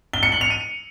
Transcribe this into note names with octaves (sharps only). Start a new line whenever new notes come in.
G7
C#7
F#7
F7
D#7